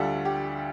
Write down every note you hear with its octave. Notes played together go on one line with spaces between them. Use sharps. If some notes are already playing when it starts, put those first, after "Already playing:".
Already playing: D2 D3 G3 F4 A4
G4